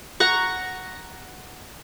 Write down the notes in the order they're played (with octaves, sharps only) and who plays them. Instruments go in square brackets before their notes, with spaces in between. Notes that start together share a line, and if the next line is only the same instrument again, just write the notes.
[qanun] F#5 A#5 C#6